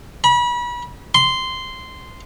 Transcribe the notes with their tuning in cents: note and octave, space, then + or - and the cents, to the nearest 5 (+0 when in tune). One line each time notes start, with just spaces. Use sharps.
B5 -35
C6 -10